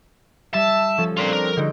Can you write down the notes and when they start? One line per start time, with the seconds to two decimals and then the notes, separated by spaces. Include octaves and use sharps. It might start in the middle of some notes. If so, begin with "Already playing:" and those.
0.54 G3 E5 A5
0.98 F3 C#4 A4
1.17 C4 D4 F4 A#4
1.33 A#4
1.56 D3 F#3 G#3 D#4 G5